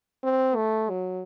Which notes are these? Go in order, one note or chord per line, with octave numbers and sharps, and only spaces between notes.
C4
A3
F#3